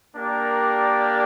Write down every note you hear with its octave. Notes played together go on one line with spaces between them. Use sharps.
A#3 D4 G4 A#4 D5